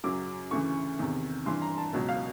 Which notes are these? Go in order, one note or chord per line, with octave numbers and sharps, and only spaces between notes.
F#2 C#3 F#3 D6
D2 C#3 E3 C#6
E2 C3 D#3
G2 E3 C6
A#5
A5
C#2 B2 F#3
F5